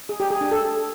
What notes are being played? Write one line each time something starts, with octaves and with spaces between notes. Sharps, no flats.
G#4
G4
G#4
D4
A4